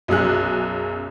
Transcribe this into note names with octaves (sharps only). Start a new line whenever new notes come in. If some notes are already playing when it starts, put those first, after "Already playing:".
B1 F#2 G#4 F#6